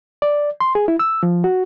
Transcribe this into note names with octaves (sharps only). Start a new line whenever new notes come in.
D5
C6
G#4
E4
E6
F3
F#4